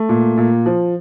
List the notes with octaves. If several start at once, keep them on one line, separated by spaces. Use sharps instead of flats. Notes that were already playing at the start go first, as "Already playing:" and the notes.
Already playing: A3
A#2
A#2
F3